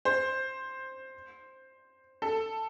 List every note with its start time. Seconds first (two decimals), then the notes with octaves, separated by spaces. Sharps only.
0.05 C5
2.22 A4